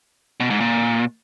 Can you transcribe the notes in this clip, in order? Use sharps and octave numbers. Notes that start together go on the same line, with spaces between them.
B2
G#2
A#2